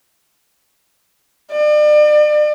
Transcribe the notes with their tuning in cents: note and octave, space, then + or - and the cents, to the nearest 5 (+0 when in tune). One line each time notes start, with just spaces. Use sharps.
D5 +40